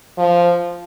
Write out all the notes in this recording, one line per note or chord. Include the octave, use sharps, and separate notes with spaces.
F3